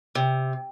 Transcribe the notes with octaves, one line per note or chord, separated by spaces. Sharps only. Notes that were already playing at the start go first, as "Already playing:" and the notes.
C3